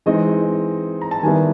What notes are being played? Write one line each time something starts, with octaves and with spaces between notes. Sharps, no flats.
E3 G#3 C4 D#4 D#5
A#5
A5
D#3 G3 B3 E4 G#5